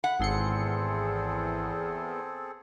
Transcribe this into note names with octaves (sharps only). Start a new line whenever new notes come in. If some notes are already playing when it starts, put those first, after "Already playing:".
F#5 B5
G#1 E2 C4 G#4 A4 C6 C#7